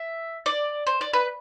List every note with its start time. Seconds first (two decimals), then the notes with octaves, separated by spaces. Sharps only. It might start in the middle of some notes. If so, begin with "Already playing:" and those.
Already playing: E5
0.46 D5
0.87 C5
1.01 D5
1.13 B4